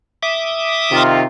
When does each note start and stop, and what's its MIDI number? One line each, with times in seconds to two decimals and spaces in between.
0.23 1.03 76
0.23 1.03 86
0.23 1.03 87
0.92 1.23 48
0.92 1.23 51
0.92 1.23 65